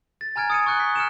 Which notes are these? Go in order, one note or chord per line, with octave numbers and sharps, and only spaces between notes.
A6
G#5 A#5 F6 G#6 D7
D#6 C#7 D#7
C#6 F6 F#6 C#7 G7
B6
F6 C#7 D7 E7